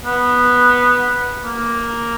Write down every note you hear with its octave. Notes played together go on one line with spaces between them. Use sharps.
B3
A#3